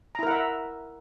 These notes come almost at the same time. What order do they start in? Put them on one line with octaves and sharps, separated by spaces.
A#5 E4 A#4 F#5 E5